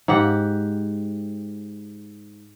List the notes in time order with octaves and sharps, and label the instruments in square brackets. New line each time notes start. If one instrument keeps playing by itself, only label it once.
[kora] G#2 G4 F#5